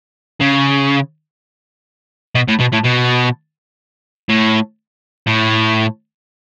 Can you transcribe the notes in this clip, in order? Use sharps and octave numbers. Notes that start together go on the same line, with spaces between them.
C#3
B2
A2
B2
A2
B2
A2
A2